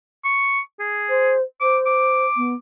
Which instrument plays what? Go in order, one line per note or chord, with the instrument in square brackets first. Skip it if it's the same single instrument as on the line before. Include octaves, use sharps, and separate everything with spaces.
[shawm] C#6
G#4
[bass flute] C5
[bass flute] C5 [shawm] D6
[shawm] D6
[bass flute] B3